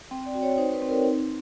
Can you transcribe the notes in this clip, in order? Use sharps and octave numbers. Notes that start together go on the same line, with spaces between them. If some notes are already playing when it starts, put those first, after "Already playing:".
C4 G5
D5
F#4
C#5
D#4 C5
B4
C4
A#4
D#4